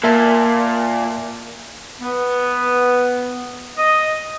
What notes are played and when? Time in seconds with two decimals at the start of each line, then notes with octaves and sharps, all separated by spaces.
0.03 A#2 A#4 E5 A5
2.02 B3
3.78 D#5